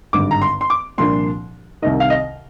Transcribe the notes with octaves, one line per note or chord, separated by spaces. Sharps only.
G#1 G2 D3 D6
A#5
C6
C6
D6
C2 A#2 F3 A#3 D4 C6
C2 C3 D#3 D#5
F5
D#5